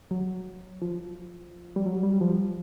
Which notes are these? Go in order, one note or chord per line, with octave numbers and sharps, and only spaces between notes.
F#3
F3
G3
F#3
G3
F3